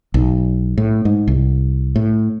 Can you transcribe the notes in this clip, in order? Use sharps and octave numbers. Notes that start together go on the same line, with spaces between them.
B1
A2
G#2
C2
A2